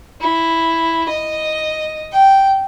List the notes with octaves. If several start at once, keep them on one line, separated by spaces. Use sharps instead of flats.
E4
D#5
G5